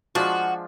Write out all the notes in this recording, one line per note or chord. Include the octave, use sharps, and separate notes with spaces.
F3 G#3 D4 F4 F#4